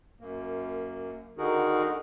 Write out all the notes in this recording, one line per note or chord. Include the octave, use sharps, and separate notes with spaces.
F#2 A#3
D3 D#3 D#4 F#4 G#4 A#4